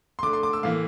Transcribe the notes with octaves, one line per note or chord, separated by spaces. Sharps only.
C6
D3 A3 D6
C6
D6
E6
A2 E3 A#3 F5